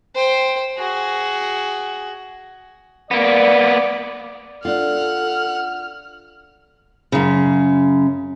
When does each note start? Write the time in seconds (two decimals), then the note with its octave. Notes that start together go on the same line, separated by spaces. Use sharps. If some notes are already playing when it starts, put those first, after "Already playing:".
0.15 C5 G5
0.78 F#4 G#4
3.11 A#3 B3 D5
4.65 D4 F4 A4 F#5 F6
7.12 F#2 C#3